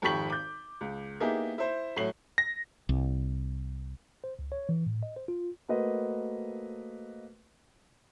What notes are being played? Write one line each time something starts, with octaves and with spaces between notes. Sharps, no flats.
G#1 F2 G4 C#6 B6 F#7
D6 G6
C#2
A#3 B3 D#4 E4 G4 G#4
E4 C5
A2 F#3 C7 F#7
A#6
C2
C5
C#2
C#5
E3
A2
D#5
C5
F4
A3 A#3 F#4 B4 C5 D#5